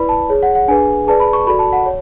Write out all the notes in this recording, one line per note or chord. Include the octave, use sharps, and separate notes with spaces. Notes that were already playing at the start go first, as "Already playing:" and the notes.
Already playing: E4 B4 D5 B5
A5
G#4 C#5
F#5
F#5
D4 G#4 B4 G#5
G#4 B4 D5 A5
B5
C#6
F#4 A4 D5 B5
A5
F#5
C#5